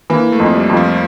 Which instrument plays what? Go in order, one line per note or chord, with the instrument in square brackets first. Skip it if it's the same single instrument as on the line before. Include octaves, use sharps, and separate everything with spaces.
[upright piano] E3 [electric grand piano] A#3
[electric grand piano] A3
[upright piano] F2
[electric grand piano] G3
[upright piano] F2
[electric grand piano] F3